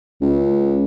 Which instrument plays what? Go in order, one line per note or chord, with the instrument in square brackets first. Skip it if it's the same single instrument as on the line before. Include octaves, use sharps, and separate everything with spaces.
[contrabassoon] C#2